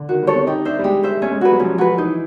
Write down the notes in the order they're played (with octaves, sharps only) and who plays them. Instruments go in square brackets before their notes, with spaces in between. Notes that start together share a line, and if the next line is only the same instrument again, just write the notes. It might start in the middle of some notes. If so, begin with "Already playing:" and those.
Already playing: [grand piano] D3
[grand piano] D#3 [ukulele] F#4
[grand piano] G3
[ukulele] A4 C#5
[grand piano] C4
[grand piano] D#4 [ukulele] G4
[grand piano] D4 [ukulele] C5 E5
[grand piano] G3
[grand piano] G#3 [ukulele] G4
[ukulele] C5 E5
[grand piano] A3 [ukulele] C#4
[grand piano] G#3
[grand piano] G3 [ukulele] F#4 B4
[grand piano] F#3
[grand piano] F3 [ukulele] C#4
[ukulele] F#4 B4
[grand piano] E3 [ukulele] D#4